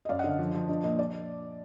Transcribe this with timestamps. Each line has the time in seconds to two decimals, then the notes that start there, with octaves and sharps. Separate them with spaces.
0.05 D#5
0.09 F#2 D5 F5
0.19 D#5 F#5
0.24 D3
0.29 D#5
0.39 F3
0.54 F3
0.68 D4 D#5
0.84 A#2 D#5
0.99 D5